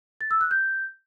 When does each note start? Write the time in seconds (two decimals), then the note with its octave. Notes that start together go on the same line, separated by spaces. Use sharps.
0.21 A6
0.31 E6
0.41 F#6
0.51 G6